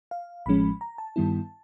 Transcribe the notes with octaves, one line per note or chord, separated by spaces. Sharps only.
F5
A1 A2 F3 G#3 C#4 B5
A#5
A5
G2 D#3 G3 B3 E4